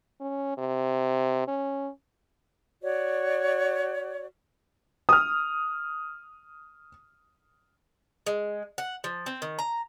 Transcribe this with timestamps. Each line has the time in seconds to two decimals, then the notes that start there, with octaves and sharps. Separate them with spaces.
0.20 C#4
0.58 C3
1.48 C#4
2.82 F#4 C#5 D5
5.09 D#6 F6
8.26 G#3
8.78 F#5
9.04 F3
9.26 C4
9.42 D#3
9.59 A#5